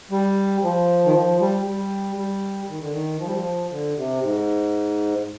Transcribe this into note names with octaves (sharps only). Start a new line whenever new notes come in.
G3
F3
D#3
F3
G3
G3
G3
D#3
D3
D#3
F3
G3
F3
D3
C3
G#2